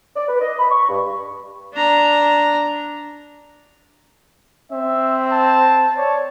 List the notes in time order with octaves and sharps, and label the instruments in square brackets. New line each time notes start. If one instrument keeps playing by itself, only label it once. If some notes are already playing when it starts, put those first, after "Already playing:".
[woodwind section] D5
B4
D#5
B5
C#6
G2
[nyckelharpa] D4 A#5
[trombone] C4 [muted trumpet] E5
[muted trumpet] A5
[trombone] C#5 [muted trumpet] D5